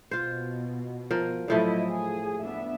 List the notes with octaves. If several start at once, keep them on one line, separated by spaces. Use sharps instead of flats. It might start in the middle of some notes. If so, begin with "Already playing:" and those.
B2 F4 C5
F3 A#4
A2 F3 F#3 A3 E4 D#5
G#4
B3 D4 E5